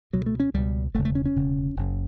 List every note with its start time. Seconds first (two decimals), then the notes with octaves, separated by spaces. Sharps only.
0.13 C#2 B2 F#3
0.26 A3
0.40 C#4
0.54 C#2 B2 G3
0.94 E1 D2 C#3 A3
1.05 A3
1.15 C#4
1.25 C#4
1.36 E1 D2 C#3
1.76 F#1 F#2 C#3